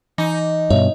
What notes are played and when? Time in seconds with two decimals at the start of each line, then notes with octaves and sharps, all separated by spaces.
0.18 E3 D#4
0.70 G2 B2 C#5 E5